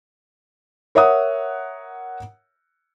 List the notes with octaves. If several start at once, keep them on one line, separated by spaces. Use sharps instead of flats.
A#4 C#5 E5 F#5 D#6